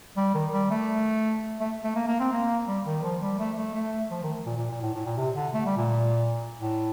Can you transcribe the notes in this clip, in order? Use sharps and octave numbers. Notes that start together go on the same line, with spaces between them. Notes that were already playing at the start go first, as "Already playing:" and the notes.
G3
D#3
G3
A3
A3
A3
A#3
A#3
C4
A#3
G3
D#3
F3
G3
A3
A3
A3
F3
D#3
A#2
A#2
A#2
A2
A2
A#2
C3
D3
A3
G3
A#2
A2